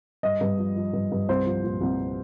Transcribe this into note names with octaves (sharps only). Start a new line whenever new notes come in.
G2 D#5
G2
F3
F3
G2
G2
C2 C5
F3
A#2
C2